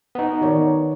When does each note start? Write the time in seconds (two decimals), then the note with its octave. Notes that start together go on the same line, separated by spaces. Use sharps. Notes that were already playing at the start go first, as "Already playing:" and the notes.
0.15 B3 D#4
0.41 D#3 C#5 D5